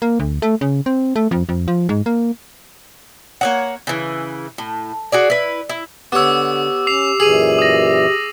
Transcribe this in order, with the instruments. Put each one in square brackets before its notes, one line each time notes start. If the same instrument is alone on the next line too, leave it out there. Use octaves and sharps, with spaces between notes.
[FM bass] A#3
D2
A3
C#3
C4
A3
F2
F2
F3
G#2
A#3
[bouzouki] A#3 C#5 F#5
C#3 E3
A2
F#4 G#4 D5
E4 B4
E4
[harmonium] D3 [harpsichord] B3 C#5 [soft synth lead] G4 [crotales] D6 E6
[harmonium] C#4 [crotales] D6 C7 F7
[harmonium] F#2 A#2 E3 [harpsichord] G#4 [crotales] D#7 F7 F#7
[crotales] D#6 A#6